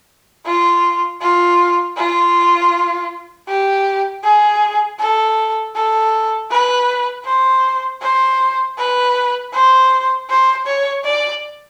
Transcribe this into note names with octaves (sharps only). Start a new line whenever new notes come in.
F4
F4
F4
G4
G#4
A4
A4
B4
C5
C5
B4
C5
C5
C#5
D5